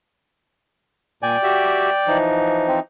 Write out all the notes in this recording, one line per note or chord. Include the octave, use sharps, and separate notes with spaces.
A#2 D5 G5 G#5
F#4 G4 E5
E3 F3 D#4
C4